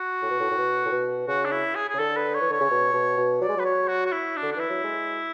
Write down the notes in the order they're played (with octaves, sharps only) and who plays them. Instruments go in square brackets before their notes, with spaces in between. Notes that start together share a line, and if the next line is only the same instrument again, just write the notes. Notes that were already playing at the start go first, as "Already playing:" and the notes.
Already playing: [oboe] F#4
[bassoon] A2
B2
A2
A2
B2
A2
B2
[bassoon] C#3 [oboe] F#4
[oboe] D4
E4
G#4
G#4
[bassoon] C#3
[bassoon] D3 [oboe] A4
[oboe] B4
C#5
[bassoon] E3
[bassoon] D3 [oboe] C#5
[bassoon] C#3
B2
B2
B2
[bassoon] F#3 [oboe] D5
[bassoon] G#3
[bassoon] F#3 [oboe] B4
[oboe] C#5
F#4
F#4
E4
D4
[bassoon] D3
[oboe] D4
[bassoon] E3 [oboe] E4
[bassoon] F#3
G#3